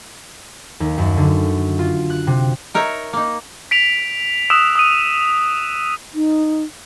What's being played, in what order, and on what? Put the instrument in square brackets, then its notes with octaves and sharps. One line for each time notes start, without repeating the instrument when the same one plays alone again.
[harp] D#2
F#2
D3
F4
F#6
C3
[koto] D#4 A#4 C#5 E5
A#3 D#4
[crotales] B6 D7 F7
D#6 E6 F#6 D7 E7
D#6 E6 D#7
[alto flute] D#4